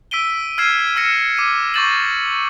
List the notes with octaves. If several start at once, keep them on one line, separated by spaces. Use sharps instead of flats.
E6 B6 D7 D#7 G7
E6 F6 G#6 C7 D#7 E7
E6 F6 A#6 C#7 E7
D6 D#7
C#6 D6 G6 A6 E7 F#7